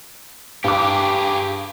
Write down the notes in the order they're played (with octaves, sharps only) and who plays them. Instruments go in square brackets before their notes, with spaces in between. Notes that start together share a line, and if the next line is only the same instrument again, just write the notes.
[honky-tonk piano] G2 D6 [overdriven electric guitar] G4 G#4